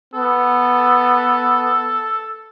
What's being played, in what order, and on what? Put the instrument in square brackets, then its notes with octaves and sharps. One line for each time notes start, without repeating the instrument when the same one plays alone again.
[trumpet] B3 [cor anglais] A4